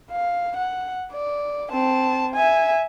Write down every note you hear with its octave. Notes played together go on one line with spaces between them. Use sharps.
F5
F#5
D5
C4 A5
E5 G#5